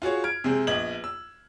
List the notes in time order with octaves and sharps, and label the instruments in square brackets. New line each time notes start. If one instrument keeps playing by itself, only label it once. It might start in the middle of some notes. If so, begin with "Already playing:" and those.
[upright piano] F4 F#4 G#4 C#5
F6 G#6 D7
C3 G#3 C4 G#4
A#1 B3 D#5 G#6 F#7
E6